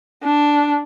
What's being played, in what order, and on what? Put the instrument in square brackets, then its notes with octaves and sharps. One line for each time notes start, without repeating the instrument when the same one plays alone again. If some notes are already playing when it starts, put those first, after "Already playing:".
[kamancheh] D4